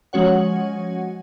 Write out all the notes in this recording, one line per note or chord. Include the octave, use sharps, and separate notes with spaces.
F3 G#3 C#4 F#4 C#5 F#5